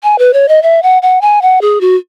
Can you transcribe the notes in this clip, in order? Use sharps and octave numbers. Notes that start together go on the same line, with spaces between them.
G#5
B4
C#5
D#5
E5
F#5
F#5
G#5
F#5
G#4
F#4